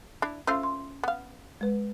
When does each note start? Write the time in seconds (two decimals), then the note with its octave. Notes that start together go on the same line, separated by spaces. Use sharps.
0.22 D4 E4
0.47 A3 C#4 F4 C5 E6
0.63 C6
1.03 B3 F5
1.61 G#3 B4